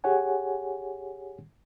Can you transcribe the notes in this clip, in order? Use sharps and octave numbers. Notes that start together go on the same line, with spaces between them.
G4 G#4 C#5 F#5 G#5